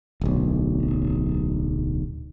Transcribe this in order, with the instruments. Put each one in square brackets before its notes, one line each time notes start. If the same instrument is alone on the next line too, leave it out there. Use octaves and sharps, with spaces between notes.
[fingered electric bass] D1 B1